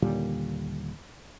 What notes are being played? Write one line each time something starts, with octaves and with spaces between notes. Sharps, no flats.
D#2 A#2 D3 G3